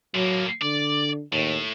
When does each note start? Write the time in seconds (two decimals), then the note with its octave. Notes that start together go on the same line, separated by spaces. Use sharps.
0.15 A2 F#3 A#3
0.62 D3 D5
1.33 D#2 A2